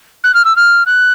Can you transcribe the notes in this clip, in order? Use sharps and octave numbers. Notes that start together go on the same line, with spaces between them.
F#6
F6
E6
F6
F#6